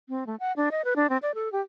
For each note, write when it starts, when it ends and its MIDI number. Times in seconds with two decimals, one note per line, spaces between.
0.09 0.26 60
0.27 0.36 57
0.40 0.52 78
0.56 0.69 62
0.71 0.82 75
0.85 0.94 71
0.96 1.09 62
1.10 1.18 60
1.22 1.32 74
1.35 1.51 69
1.52 1.61 67